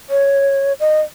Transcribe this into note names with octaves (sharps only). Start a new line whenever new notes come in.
C#5
D#5